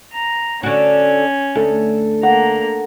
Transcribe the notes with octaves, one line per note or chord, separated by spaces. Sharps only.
A#5
D3 C#4 F#4
D2 A4
A#3 F#5 A#5